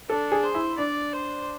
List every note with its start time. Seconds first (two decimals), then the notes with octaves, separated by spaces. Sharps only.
0.09 D4 A4
0.32 G#4
0.43 C5
0.55 E4
0.78 D4 D5
1.13 C5